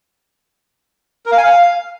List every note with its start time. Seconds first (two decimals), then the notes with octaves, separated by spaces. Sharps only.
1.26 A#4
1.32 F5
1.38 G#5
1.43 F5